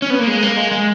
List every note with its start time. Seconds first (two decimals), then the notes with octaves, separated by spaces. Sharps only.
0.02 C#4
0.10 B3
0.19 A#3
0.27 G#3
0.43 A#3
0.57 G#3
0.71 G#3